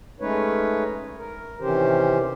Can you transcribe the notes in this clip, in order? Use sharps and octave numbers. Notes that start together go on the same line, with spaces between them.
G#3 A3 C#4 D#4 B4 C#5
A#4
C3 D#3 E3 C#4 G4 C5